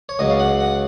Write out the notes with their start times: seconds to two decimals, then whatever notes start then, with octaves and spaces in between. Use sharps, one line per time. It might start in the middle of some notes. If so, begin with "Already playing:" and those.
0.09 C#5
0.19 C#2 C#3 F#3 D#5
0.30 F5
0.40 F#5
0.60 F#5